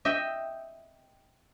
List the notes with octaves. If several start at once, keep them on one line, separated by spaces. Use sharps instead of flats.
D#5 E5 G5